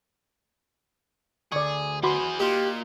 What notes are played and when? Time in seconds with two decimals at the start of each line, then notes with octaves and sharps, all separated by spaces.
1.52 D2 G#4 D5 C#6
2.03 E3 F#4 G#4 B5 C6
2.40 A#2 D#4 F4 G4